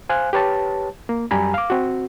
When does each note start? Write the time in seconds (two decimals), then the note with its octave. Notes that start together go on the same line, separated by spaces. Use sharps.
0.09 C5 F5 G#5 F#6
0.33 G4 B4 C#5 A5
1.09 A#3
1.31 F#2 G3 G4 G#5 A#5 B5
1.54 F5 D6
1.70 C4 F#4